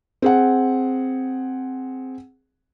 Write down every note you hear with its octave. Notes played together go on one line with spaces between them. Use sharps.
C4 G#4 F#5